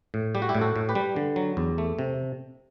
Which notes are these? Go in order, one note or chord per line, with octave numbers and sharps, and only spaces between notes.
A2
G3 G4
F#4
E4 G4
A2
F#4 A4
A2
G4 B4
G3
D3
F#3
E2
A3
C3